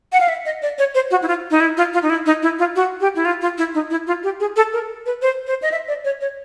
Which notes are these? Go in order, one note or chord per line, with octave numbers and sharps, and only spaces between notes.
F#5
F5
E5
D#5
D5
C#5
C5
F#4
E4
F4
D#4
E4
F4
F4
D#4
E4
D#4
E4
F4
F#4
G4
E4
F4
F4
E4
D#4
E4
F4
G4
G#4
A4
A#4
B4
C5
C5
D#5
E5
D5
C#5
C#5